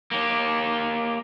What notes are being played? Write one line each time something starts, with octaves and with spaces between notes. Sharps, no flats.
A#3 G4